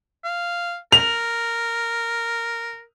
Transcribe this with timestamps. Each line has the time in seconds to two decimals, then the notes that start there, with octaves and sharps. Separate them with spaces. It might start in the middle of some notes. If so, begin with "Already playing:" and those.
0.24 F5
0.92 A#4 F7